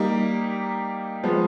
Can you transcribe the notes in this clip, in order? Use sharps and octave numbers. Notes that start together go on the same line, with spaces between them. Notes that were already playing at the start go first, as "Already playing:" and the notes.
Already playing: G3 A#3 D#4 G4
F3 G#3 B3